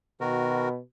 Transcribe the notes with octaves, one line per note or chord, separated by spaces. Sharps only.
B2 D#3 F#4 A#4